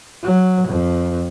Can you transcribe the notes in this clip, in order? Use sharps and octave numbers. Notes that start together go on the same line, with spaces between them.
F#3
F2